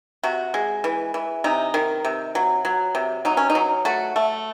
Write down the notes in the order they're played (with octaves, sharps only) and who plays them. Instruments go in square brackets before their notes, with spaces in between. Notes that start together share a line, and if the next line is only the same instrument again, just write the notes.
[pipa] C3 F#4
G#3
E3
E3
C3 D#4
D#3
C3
F#3
F#3
C3
F#3 D#4
C#4
D#4
F#3
A3 F#4
A3